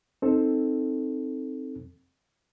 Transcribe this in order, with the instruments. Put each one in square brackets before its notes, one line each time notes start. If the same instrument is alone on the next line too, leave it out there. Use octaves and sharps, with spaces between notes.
[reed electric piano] C4 D#4 A4